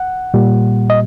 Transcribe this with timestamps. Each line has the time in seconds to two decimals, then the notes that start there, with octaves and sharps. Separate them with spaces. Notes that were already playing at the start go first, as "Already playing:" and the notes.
Already playing: F#5
0.34 A#2 G3
0.90 D#5